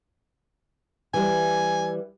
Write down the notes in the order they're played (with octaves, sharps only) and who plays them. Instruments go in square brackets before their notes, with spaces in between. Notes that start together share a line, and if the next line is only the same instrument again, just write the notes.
[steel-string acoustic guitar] E3 G3 [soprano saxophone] G#5